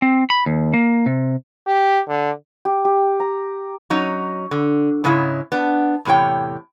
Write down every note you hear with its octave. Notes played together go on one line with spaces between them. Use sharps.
C4
B5
D#2
A#3
C3
G4
D3
G4
G4
A#5
F#3 C#4 D#4
D3
G#2 C#3 G#3 C#4 E4
B3 D4
E2 A2 C3 C#5 G5